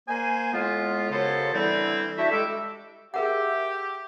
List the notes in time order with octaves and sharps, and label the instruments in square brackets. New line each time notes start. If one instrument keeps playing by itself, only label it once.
[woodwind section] A#3 C5 G#5
A2 G#3 B3 F4
F#2 C#3 B3 A4 C5 C#5
D3 E3 G3 C4 E4
D4 E4 F#4 G4 E5
G3 G#3 A4 D6 E6
[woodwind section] G4 [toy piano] G#4 A#4 F#5 [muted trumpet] E5